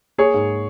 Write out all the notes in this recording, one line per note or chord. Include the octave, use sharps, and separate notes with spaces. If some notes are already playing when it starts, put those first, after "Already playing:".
A#3 G#4 C#5
G#2